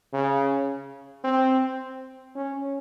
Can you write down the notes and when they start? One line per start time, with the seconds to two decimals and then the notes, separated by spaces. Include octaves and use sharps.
0.13 C#3
1.24 C4
2.35 C#4